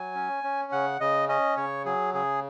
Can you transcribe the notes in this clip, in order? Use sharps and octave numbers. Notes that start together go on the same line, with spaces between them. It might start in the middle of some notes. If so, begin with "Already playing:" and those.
Already playing: F#3 G#5
C#4
C#4
C#3 F#5
C#3 D#5
C#4 D#5
C#3 C#5
F#3 G#4
C#3 G#4